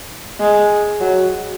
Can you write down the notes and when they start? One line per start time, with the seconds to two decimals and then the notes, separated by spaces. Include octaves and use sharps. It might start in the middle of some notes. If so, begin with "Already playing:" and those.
0.40 G#3
1.00 F#3